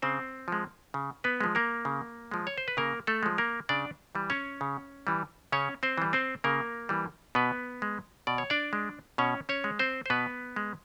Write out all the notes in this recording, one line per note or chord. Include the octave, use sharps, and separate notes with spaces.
C#3 C4 C5
F3 G#3
C#3
B3 B4
F3 G#3
A#3 A#4
C#3
F3 G#3
C#5
C5
B4
C#3 A#3 A#4
A3 A4
F3 G#3
A#3 A#4
C#3 D4 D5
E3 G3
C#4 C#5
C#3
E3 G3
C#3 C#4 C#5
C4 C5
E3 G3
C4 C5
C#3 A#3 A#4
E3 G3
B2 B3 B4
G#3
B2 D5
C#5
D4 D5
G#3
B2 C#4 C#5
C#4 C#5
G#3
C4 C5
C5
B2 B3 B4
G#3